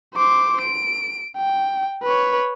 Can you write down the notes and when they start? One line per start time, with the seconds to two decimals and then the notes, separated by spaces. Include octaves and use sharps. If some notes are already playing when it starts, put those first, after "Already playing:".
0.15 C5 D6
0.62 D7
1.37 G5
2.03 B4 C#5